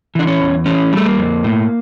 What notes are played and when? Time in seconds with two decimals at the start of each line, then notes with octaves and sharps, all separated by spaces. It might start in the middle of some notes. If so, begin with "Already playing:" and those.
0.15 E3 D4
0.27 C#4
0.40 E2
0.66 E3 C#4
0.92 G3 A3
1.06 A#3
1.18 F2
1.44 A2